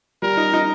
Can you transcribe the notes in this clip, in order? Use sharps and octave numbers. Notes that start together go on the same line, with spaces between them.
G3 A#4
D#4
D#4